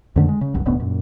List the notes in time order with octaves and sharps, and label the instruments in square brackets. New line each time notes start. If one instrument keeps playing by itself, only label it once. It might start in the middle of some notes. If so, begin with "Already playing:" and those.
[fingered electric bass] F2 D3 D#3 A3
G#3
C#3
C2 G2 F#3
F1 D2 A2 B3
F#2 A#2